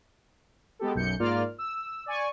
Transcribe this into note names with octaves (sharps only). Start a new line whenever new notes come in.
G#3 B3 G4 A4
B1 F#2 G6 C#7
G#2 A#3 F4 D5 F6
E6
D5 G#5 C#6